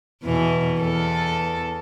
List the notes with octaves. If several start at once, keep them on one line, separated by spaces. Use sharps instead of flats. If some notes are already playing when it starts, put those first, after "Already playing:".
E2 B2 E3
E2 A4